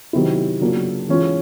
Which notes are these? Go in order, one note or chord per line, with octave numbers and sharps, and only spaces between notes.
C3 D#3 F#3 B3 E4
C#3 F#3 A#3 D4 F4
E3 G#3 C#4 F4